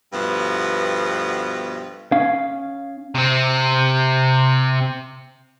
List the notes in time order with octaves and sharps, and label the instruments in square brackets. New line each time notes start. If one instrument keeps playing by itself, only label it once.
[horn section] G2 B2 F3 A3 B3
[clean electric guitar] C#4 F5
[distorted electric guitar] C3 C4